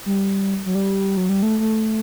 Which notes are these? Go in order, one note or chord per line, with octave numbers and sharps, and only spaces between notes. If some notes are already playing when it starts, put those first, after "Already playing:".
G3
F#3
G3
F#3
G3
A3
A3